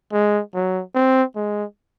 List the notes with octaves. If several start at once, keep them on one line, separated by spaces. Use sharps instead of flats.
G#3
F#3
C4
G#3